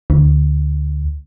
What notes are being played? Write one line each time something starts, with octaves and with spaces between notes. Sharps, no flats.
D2